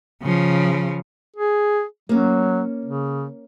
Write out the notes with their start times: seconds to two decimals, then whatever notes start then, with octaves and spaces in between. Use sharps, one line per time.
0.22 C#3 F3
1.36 G#4
2.09 F#3 A#3 C#4
2.85 C#3